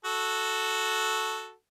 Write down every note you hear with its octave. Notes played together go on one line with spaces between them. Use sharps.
F#4 A4